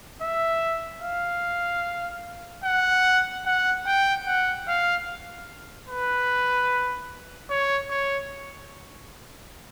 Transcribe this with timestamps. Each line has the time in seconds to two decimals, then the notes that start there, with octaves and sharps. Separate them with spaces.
0.22 E5
1.02 F5
2.64 F#5
3.45 F#5
3.86 G5
4.26 F#5
4.67 F5
5.88 B4
7.50 C#5
7.90 C#5